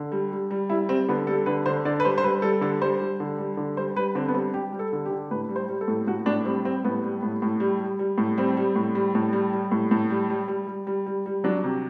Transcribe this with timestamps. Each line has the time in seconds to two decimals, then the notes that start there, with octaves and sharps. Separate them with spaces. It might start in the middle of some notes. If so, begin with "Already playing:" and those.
Already playing: D3
0.12 G3
0.31 G3
0.51 G3
0.69 G3 E4
0.89 G3 C4
1.08 D3 B3
1.27 G3 A4
1.46 D3 B4
1.66 D3 C5
1.85 D3 D5
2.00 B4
2.05 G3 C5
2.18 C5
2.23 G3 B4
2.42 G3 A4
2.61 D3 A4
2.81 G3 C5
3.00 G3
3.20 D3
3.38 G3
3.57 D3
3.77 G3 C5
3.96 G3 B4
4.15 D3 C4
4.28 B3
4.34 G3 C4
4.54 G3 G4
4.72 G3
4.79 A4
4.93 D3
5.05 G4
5.11 D3
5.31 A2 B4
5.49 G3
5.56 C5
5.69 G3
5.81 A4
5.88 A2
6.07 A2 F#4
6.26 A2 D4
6.45 G3 C4
6.64 G3 C4
6.84 A2 B3
7.04 G3
7.23 A2
7.42 A2
7.60 G3
7.80 G3
7.99 G3
8.18 A2
8.38 G3 C4
8.57 G3
8.76 A2
8.95 G3
9.15 A2
9.33 G3
9.53 G3
9.71 A2
9.91 A2
10.10 G3
10.30 G3
10.48 G3
10.67 G3
10.87 G3
11.06 G3
11.26 G3
11.44 F#3 D4
11.64 C3